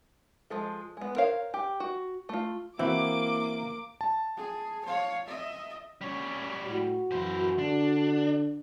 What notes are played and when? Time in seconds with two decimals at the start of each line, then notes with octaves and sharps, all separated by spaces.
0.50 F3 G#3 A4
0.97 G#3 B3
1.16 A#4 C5 C#5 F5
1.54 G4
1.80 F#4
2.29 A3 F4
2.79 E3 A#3 C4 E4 F#4 D6
4.01 A5
4.36 G#4
4.85 C#5 F5
5.26 D#5 E5
6.01 G3 C#4 C#5
6.67 A2 F#4
7.12 F#2 E3 C5
7.59 D3 D4